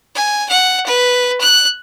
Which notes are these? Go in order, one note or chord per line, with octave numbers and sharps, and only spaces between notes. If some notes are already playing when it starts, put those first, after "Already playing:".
G#5
F#5
B4
F#6